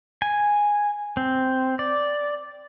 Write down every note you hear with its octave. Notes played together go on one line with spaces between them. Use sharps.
G#5
C4
D5